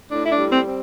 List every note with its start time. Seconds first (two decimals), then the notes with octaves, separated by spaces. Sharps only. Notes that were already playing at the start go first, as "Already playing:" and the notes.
0.11 A2 D4
0.26 E4
0.31 D4
0.38 G3
0.52 C4
0.65 C4